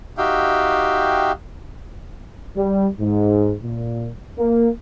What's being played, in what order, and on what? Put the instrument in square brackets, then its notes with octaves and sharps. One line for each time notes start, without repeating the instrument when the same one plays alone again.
[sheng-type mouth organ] D#4 F#4 G4 E5 F5 G5
[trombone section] G3
G#2
A#2
A#3